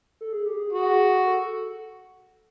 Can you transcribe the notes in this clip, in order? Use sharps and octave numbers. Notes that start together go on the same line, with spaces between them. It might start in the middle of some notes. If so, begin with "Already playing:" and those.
A4
G#4
G4
G#4
F#4
A4